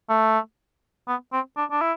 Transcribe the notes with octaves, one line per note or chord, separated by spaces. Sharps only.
A3
B3
C4
D4
D4
E4